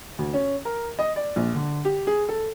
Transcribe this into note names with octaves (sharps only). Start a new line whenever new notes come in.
D2
C#4
A#4
D#5
D5
A#1
D3
G4
G#4
A4